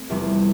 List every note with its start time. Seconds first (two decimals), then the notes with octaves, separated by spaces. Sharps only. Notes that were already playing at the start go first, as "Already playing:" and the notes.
Already playing: A3 C4
0.10 F1 E2 C3 G3